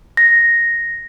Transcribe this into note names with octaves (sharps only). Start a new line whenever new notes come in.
A#6